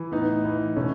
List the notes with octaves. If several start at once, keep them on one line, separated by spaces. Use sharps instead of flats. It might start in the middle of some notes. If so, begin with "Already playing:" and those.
Already playing: E3
A2 B3 D#4
E3
B2 A3 C#4